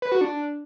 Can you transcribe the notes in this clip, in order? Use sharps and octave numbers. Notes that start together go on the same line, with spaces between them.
B4
F#4
D4